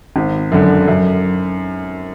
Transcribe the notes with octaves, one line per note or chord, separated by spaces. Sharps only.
G#1
F#2 D3
F#2